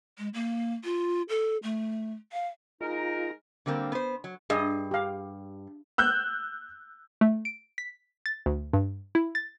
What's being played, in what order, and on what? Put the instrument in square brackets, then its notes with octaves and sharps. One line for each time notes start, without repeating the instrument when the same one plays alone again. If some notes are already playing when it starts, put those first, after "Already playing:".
[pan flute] G#3
A#3
F4
A4
A3
F5
[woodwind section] G#3 D#4 A#4 [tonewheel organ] F4 A#5
[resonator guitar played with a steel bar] D3 G3 A#3 C4
B3 C5
F#3
[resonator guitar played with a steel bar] G2 [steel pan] G#4 D#5
[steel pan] G4 F5
[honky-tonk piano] E6 F#6 G6
[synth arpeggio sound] A3
D7
B6
A6
D2
G2
E4
A6